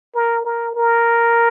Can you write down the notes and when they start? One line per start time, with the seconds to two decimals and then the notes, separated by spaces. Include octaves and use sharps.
0.15 A#4
0.45 A#4
0.75 A#4